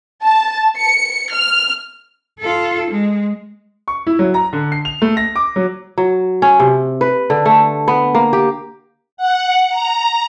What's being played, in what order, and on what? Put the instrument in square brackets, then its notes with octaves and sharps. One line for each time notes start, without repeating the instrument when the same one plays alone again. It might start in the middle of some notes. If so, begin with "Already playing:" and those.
[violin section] A5
C#7
F6
[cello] F4 A4
G#3
[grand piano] C#6
E4
F#3
A#5
D3
C7
F7
A3
A#6
D6
F#3
[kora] F#3
C#4
C3
B4
D3
A3
B3
A#3
G4
[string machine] F#5
A#5